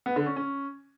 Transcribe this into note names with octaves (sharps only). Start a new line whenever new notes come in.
B3
D3
C#4
C#4